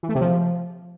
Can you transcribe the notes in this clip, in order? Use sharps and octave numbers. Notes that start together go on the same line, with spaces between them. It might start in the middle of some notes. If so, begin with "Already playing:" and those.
E3
A3
C3
F3